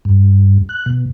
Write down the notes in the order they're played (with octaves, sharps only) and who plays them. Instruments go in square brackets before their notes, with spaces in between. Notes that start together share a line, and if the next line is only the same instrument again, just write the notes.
[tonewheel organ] G2
F#6
B2